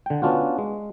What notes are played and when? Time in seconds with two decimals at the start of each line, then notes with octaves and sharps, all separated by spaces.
0.06 D3 G5
0.22 B3 C#4 D4 F4 F#4
0.58 G#3